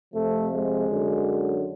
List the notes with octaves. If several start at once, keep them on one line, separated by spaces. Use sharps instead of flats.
F2 C3 F3 A3
G#3
F#2 D3 F#3